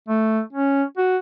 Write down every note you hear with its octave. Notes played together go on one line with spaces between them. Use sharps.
A3
C#4
F#4